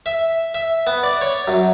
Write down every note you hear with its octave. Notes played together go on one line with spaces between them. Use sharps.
E5
E5
B3
D5
C#5
F#2